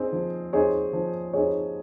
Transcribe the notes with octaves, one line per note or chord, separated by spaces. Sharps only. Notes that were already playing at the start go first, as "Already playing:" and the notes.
Already playing: C4 D#4 G#4
F3
C4 D#4 G#4 C#5
F3
C4 D#4 G#4 C#5